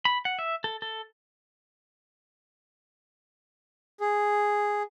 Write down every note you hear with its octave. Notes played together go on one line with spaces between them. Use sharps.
B5
F#5
E5
A4
A4
G#4